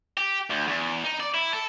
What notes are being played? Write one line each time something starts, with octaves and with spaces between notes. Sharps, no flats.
G4
D2
E2
D#4
D5
E4
A4